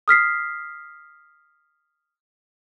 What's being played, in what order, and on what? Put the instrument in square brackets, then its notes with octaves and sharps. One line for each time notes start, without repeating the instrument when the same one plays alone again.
[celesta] D#6 F6 B6 C7